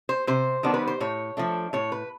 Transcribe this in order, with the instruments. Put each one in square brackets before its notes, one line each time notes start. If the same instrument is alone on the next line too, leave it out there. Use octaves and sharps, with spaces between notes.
[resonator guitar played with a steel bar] C5
C3 C5
D#3 G3 B3 D4
B4
C5
A2 C#5
F3 A3 D4
A2 C#5
B4